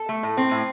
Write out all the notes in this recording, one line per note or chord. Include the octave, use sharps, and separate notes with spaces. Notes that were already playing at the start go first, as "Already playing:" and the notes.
Already playing: A4
A3
A2
C4
A2